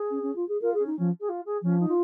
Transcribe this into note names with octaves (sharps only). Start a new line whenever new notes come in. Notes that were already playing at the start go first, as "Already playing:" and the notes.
Already playing: G#4
C#4
C#4
F4
G#4
F4 A#4
C#4 G#4
D#4
F3 C#4
G#4
F4
G#4
F3 C#4
D#4
F4